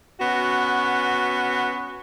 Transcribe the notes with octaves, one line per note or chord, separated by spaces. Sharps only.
B3 C#4 F#4